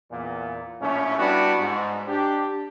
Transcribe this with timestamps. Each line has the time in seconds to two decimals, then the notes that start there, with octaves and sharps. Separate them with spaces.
0.11 E2 A#2
0.81 A#1 A2 A3 C#4
1.18 G3 B3 D4 E4 F#4
1.60 G#2
2.08 D4 G4